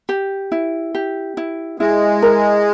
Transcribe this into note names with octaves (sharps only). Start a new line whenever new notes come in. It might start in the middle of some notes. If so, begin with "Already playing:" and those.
G4
E4
G4
E4
G#3 E4
A#4